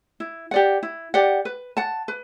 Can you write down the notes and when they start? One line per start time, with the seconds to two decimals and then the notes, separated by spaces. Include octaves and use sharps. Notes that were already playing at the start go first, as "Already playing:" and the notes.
0.20 E4
0.51 G4 D5 F#5
0.83 E4
1.14 G4 D5 F#5
1.45 B4
1.77 F#5 A5
2.08 B4